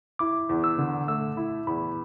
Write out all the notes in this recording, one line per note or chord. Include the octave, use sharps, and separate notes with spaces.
E4 D6
E2
E6
D3
A3 E6
E4
E2 B5